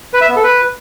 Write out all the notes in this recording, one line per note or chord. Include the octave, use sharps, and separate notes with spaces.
B4
E5
B3
A4
B4